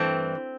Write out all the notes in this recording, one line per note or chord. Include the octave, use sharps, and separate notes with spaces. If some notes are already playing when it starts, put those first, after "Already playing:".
Already playing: G2 E3 A3 C4